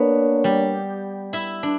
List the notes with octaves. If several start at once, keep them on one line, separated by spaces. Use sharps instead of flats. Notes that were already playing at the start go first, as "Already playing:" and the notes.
Already playing: A#3 B3 D4 A#4 B4 C#5
G3 G4
E4 E5
D4